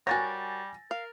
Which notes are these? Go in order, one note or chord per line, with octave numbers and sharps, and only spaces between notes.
G3 F#4 A#4 C#5 G#5 A6 A#6
A#4 F5